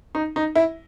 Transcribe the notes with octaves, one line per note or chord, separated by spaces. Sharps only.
D#4
D#4
E4